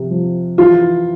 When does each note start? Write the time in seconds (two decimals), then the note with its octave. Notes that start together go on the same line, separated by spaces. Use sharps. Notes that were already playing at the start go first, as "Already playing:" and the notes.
Already playing: C3 F3
0.11 F3
0.58 E3 F4